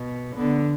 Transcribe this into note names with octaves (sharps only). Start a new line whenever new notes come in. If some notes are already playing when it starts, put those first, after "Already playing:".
Already playing: B2
D3 B3